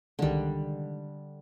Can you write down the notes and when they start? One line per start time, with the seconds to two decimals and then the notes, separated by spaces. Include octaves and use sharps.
0.19 C2 D3 D#3 G3 G#3